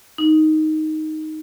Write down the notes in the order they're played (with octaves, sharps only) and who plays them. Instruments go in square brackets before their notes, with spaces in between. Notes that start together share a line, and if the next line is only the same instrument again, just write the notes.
[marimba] D#4